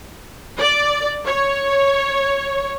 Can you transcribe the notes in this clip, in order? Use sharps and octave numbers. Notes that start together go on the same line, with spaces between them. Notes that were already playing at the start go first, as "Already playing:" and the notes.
D5
C#5